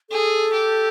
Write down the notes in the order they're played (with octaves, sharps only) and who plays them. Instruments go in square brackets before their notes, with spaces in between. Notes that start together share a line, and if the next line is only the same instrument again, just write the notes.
[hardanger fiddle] G#4 [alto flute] A4
[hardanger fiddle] G4